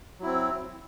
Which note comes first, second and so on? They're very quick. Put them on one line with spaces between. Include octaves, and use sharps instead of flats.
F#3 E4 C4